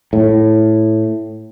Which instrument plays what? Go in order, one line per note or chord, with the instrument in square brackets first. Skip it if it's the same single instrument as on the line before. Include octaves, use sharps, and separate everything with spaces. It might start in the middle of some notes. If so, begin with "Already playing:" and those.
[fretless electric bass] A2